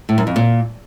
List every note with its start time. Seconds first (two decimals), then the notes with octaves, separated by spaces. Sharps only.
0.09 A2
0.18 F#2
0.27 F2
0.36 A#2